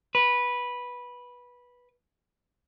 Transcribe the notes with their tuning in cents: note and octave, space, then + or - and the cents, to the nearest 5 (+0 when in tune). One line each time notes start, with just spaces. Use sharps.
B4 -10